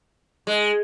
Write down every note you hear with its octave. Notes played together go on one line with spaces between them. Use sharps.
G#3